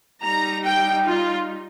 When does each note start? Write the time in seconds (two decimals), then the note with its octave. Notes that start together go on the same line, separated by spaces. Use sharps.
0.23 G3 D#4 A#5
0.64 G5
1.07 F4